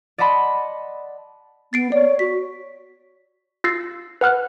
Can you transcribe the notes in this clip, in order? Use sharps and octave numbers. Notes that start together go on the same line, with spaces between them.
D5 D#5 F#5 A5 B5 C6
B3 A6 C7 D7
C#5 D5
F#4 B6
F4 E6 A6 C7
B4 F#5 F6 F#6